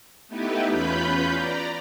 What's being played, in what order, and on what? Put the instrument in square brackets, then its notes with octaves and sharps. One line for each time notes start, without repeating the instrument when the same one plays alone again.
[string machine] A3 B3 D#4 E4 G4 B4
E2 C#4 F4 B4 B5 G6
D5 A#5